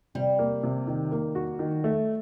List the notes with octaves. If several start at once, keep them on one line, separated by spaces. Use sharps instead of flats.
C3 G3
A#3
C3
D#3
A#3
F#4
D#3
A3